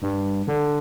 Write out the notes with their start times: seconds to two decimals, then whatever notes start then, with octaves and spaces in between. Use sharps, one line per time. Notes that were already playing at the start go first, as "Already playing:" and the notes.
0.02 G2
0.47 D3